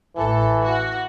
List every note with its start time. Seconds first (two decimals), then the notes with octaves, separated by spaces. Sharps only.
0.16 A1 E3 A4
0.65 F#4